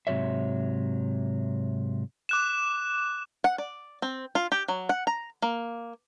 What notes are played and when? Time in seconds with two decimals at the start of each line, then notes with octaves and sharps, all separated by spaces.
0.07 G#2 C3 F#3 C#5 E5
2.29 D6 F#6 E7
3.44 F#5
3.58 D5
4.02 C4
4.35 F4
4.52 G4
4.68 F#3
4.89 F#5
5.07 A#5
5.42 A#3